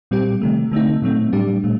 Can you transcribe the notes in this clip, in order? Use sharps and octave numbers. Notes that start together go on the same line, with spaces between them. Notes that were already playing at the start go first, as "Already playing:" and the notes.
A#2 G3 C4 G4
C3 D#3 A3
D3 A3 C4 D#4
A#2 F#3 A3 C4
A2 G3 D4 G4
A#2 A3